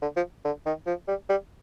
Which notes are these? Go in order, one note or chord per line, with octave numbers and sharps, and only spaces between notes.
D3
F3
D3
D#3
F3
G3
G3